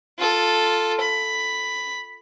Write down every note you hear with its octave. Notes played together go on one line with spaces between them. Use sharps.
F4 A4
B5